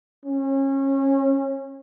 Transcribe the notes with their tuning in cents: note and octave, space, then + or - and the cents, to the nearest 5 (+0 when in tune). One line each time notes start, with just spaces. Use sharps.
C#4 -30